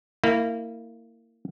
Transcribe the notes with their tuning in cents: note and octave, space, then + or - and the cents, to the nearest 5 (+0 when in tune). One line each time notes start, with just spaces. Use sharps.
A#3 -25 E4 -5